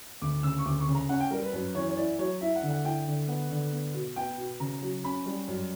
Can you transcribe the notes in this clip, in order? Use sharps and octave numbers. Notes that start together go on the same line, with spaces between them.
D2 D6
C#3 E6
C#6
D2 D6
C#6
C#3
A#5
C#4 F#5
G5
G3 A#4
B4
F#2 B4
E3 C#5
C#5
E4 D5
F#3 C#5
E4 E5
F#5
D3
F#5
E4 G5
D3
B3 F#5
D3
B3
B2
B3 G5
B2
C#3 A#5
F#3
C#4 B5
G3
F#2